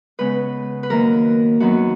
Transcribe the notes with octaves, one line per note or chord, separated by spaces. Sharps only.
C#3 G#3 B3 B4
B4
F#2 D#3 A#3 A#4
F#2 D#3 F#3 B3 D#4 F#4